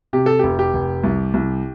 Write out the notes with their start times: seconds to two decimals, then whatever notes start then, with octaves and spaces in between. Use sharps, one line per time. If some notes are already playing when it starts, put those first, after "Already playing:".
0.13 C3 G4
0.26 A4
0.39 F1 G4
0.59 G4
0.74 F1
1.04 C2
1.34 C2